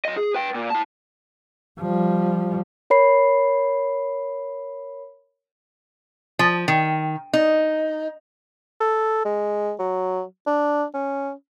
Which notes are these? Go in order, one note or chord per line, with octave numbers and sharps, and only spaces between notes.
F#3 D#5
G#4
B4 G5
A#2
E4 A5
F3 G3
A#4 C#5 B5 C7
F3
D#3
D#4
A4
G#3
F#3
D4
C#4